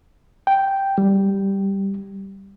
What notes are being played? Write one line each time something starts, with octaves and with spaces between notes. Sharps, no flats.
G5
G3